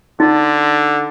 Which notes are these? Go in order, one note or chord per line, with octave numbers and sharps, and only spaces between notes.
D3 D#4